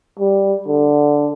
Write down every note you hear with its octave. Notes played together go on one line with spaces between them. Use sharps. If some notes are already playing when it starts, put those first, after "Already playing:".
G3
D3